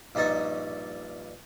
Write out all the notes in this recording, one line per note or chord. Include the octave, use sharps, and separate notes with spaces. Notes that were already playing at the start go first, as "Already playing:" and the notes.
A#1 G2 D#4 A5 C#6